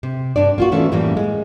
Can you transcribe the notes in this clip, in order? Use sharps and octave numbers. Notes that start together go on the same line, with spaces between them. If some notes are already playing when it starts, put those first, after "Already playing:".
C3
G2 D4 D5
A#3 F4 F#4
E3 A3 B3 C#4
F#2 A2 E3 G3 A#3
G#3